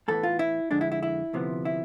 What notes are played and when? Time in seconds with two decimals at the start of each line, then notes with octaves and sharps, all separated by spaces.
0.08 A2 E3 B3 A4
0.23 F4
0.39 E4
0.71 F2 D3 G#3 D4
0.81 E4
0.92 E4
1.03 E4
1.33 D2 C3 F3 B3
1.65 E4